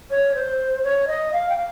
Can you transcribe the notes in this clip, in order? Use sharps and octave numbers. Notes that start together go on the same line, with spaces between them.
C#5
C5
C#5
D#5
F5
G5
F5